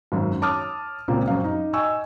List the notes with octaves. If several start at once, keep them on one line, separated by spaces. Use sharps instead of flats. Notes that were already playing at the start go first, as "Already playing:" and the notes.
G#1 F#2
C#5 A5 D6 D#6 F6
C#2 A#2 C#3 A#3 C4
F#2 C4 F5
D#4
D#5 G5 G#5 C#6 E6